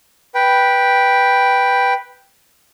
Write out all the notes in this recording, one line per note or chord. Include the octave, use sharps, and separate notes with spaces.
B4 G5